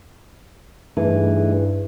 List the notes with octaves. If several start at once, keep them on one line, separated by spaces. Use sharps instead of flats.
G2 E3 A3 D#4 G#4